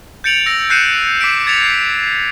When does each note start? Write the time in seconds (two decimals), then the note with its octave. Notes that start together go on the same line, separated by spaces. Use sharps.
0.24 G6 A6 C#7 D7 F7 F#7
0.46 E6 A#6 F#7
0.70 F#6 G6 C7 C#7 D#7 E7
1.21 D6 B6 C7 D7
1.46 D6 G#6 A6 B6 C#7 F7
1.63 C7